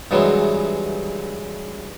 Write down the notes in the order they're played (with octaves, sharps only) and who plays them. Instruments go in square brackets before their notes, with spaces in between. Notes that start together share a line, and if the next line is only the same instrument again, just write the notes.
[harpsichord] G2 C3 E3 F#3 G#3 B3